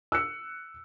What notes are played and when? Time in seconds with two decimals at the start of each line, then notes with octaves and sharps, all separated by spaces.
0.12 E6 F#6 C#7